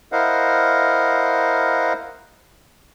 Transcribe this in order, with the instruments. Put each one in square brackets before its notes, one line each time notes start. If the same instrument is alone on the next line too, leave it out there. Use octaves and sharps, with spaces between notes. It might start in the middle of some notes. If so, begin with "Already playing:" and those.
[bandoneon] E4 A#4 C5 D#5 F5 F#5